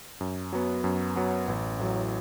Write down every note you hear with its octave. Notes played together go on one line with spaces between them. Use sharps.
F#2
F#3 B3
F#2
F#3 B3
A1
A2 F#3